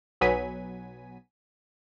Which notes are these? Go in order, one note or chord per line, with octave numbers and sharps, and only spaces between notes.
B1 F#3 B3 G#5 B6 D#7